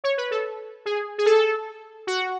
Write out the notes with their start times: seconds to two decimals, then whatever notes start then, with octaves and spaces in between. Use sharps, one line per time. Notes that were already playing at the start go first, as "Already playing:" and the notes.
0.04 C#5
0.17 B4
0.31 A4
0.86 G#4
1.18 G#4
1.26 A4
2.07 F#4